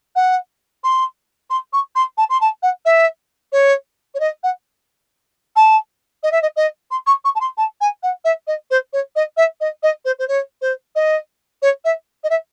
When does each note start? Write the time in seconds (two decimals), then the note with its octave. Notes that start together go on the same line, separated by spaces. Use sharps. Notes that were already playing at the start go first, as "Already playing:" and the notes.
0.15 F#5
0.83 C6
1.50 C6
1.73 C#6
1.95 C6
2.17 A5
2.29 C6
2.41 A5
2.62 F#5
2.85 E5
3.52 C#5
4.14 C#5
4.20 D#5
4.43 F#5
5.56 A5
6.23 D#5
6.32 E5
6.42 D#5
6.56 D#5
6.90 C6
7.06 C#6
7.24 C#6
7.35 A5
7.40 C6
7.57 A5
7.80 G#5
8.03 F#5
8.24 E5
8.47 D#5
8.70 C5
8.93 C#5
9.15 D#5
9.37 E5
9.60 D#5
9.83 D#5
10.05 C5
10.19 C5
10.28 C#5
10.61 C5
10.95 D#5
11.62 C#5
11.84 E5
12.23 D#5
12.30 E5